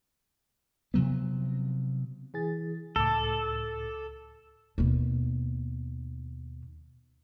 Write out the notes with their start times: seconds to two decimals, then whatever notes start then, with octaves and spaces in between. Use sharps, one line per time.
0.94 C3 F3 F#3 B3
2.34 E3 G#4 A6
2.96 C#2 A2 A4 D6
4.78 D#2 B2